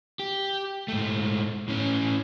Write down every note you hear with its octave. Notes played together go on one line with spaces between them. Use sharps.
G4
G#2 A3
A2 C#4